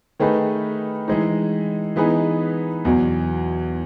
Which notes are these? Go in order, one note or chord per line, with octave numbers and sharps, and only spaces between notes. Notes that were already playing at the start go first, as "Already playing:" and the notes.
D#3 A3 D#4 G#4 B4
E3 G#3 D#4
E3 B3 D#4 G#4 B4
E2 B2 F#3